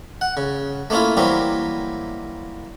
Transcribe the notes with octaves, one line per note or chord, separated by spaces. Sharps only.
F#5
C#3
A3 A#3 C#4 E4 F4
E3 F#3 G3 A#3 C4